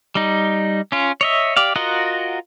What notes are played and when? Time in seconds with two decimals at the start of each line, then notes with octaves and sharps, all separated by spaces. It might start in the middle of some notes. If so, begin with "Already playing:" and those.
0.15 G3 D#4
0.92 C#4 F4
1.21 C#5 D#5 E5
1.56 G4 D5 F5
1.76 F4 F#4 A#4 D#5 F#5